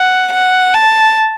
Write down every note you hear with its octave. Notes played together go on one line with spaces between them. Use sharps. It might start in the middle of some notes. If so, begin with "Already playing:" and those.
Already playing: F#5
F#5
A5